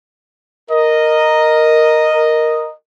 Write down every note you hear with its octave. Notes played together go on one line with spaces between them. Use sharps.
A#4 D#5